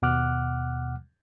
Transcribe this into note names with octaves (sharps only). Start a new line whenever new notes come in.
D#2 B2 F#5 D6 F6 F#6